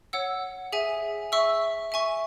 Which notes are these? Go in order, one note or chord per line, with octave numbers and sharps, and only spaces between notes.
C#5 F#5 E6
G#4 E5 G#5
E5 C#6 E6
E5 G#5 C#6